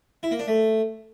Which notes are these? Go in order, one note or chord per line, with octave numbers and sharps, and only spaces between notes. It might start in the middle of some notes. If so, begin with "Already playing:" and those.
E4
A#3
D4
A3